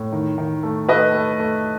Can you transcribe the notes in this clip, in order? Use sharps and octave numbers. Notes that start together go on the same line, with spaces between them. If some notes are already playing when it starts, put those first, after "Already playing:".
Already playing: A2
D#3
D#3
A3
A3 B4 D#5
A3
A3